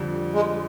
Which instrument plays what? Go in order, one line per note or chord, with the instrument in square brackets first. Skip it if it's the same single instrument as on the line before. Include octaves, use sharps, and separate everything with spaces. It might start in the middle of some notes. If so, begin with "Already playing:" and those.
Already playing: [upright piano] F2 D3 G3
[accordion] G#3